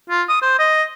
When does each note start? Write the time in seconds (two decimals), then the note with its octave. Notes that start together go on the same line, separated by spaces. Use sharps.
0.10 F4
0.29 D#6
0.42 C5
0.59 D#5